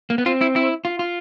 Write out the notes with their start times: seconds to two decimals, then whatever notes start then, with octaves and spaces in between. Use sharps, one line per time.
0.10 A#3
0.18 B3
0.26 C4 F4
0.41 E4
0.56 E4
0.85 F4
0.99 F4